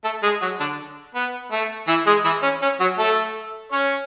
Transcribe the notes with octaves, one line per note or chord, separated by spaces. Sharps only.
A3 A4
G#3 G#4
F#3 F#4
D3 D4
B3
A3
E3 E4
G#3 G#4
E3 E4
C#4
C#4
F#3 F#4
A3 A4
C#4 C#5